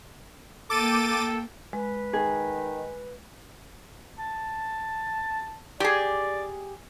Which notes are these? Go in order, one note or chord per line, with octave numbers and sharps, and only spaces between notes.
A#3 A4 G5 D6 A6 D#7
A4
G#3 B4
D#3 G#4
A5
G4 G#4 D5